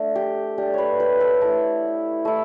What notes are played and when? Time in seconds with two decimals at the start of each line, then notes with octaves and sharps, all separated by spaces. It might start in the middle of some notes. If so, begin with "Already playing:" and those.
Already playing: A3 D4
0.15 G4
0.58 A3 D4 G4
0.74 B4 C#5
1.00 B4
1.20 A4
1.41 A3 E4
2.25 A3 E4